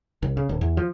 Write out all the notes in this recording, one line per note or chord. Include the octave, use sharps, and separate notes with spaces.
C2
C#3
D1
E2
F3